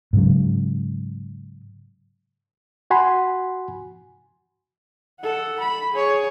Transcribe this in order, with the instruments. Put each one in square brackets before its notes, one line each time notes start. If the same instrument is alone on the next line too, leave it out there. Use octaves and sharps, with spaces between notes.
[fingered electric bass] G#2 C#3 F#3
[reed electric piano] F#4 F#5 G#5 B5 C6
[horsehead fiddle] A4 F#5
B5
G#4 C#5